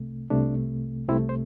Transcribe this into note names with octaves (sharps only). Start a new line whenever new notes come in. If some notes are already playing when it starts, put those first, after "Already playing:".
Already playing: C2 C3 A3
C2 C3 A3 D4
C2 C3 A3 C4 E4
C5